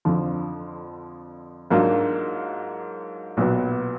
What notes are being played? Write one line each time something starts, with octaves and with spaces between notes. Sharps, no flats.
F2 D3 F3
G#2 F#3 A#3 D4 F4
B1 A#2 F#3 B3